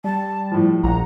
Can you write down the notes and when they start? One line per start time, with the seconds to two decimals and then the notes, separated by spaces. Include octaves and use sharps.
0.04 G3 A5
0.52 A2 F3
0.84 A#1 F#5 A#5